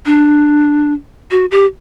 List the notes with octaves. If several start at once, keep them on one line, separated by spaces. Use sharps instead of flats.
D4
F#4
G4